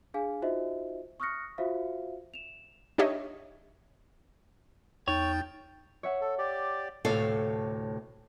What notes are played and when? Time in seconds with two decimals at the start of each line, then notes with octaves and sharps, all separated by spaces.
0.14 D4 G#4 F5 G#5
0.42 D#4 F4 F#4 C5 D#5 E5
1.20 C#6 D#6 F6 F#6 A#6 C#7
1.58 F4 F#4 C5 E5 F5
2.34 E7 F7
2.98 D4 D#4 G4 C#5 D#5 E5
5.08 E2 D#4 C#5 G5 A6
6.03 C#5 E5 F#5
6.21 A4
6.38 G4 D5
7.05 D2 A2 C3 A4 C#5 F5